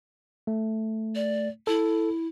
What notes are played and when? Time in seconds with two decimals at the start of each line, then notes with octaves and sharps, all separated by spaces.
0.47 A3
1.15 D5
1.67 E4 A4